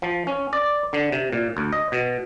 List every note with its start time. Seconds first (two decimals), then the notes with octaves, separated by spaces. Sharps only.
0.02 F3
0.27 C#4
0.53 D5
0.93 D3
1.12 C3
1.33 A#2
1.57 D2
1.72 D#5
1.92 B2